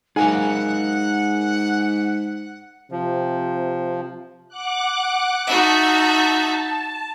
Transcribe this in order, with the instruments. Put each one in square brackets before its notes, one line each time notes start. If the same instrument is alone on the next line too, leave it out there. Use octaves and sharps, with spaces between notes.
[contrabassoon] G#2 [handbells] D#4 G#5 [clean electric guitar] G#4 A#4 F5 [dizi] F#5
[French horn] C3 [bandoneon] F3
[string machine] F#5 D6 F#6
[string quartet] D#4 F#4 E5 [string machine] A5